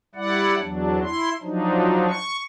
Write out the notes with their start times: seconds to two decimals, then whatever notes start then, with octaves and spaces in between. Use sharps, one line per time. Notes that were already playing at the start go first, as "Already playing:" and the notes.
0.15 G3 E4 D5 F#5
0.59 E2 F#3 D4
1.02 E4 C6
1.42 F3 F#3 D4 D#4
2.08 C#6